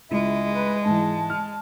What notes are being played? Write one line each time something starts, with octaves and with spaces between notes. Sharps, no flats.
C#2 G#3 E4
B4
G#2 E3 A5
F6